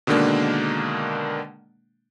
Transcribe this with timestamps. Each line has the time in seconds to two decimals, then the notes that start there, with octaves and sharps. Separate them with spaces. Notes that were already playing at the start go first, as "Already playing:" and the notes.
0.07 B2 D3 D#3 G#3 A#3 D4